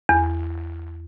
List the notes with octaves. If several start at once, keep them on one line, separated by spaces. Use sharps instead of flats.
E2